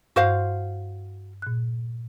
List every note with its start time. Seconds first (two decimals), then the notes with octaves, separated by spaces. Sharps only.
0.16 G2 F#4 C5 F5
1.42 A#2 F#6